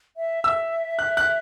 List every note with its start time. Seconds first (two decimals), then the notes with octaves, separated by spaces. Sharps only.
0.17 E5
0.44 E5 E6
0.99 F#6
1.17 F#6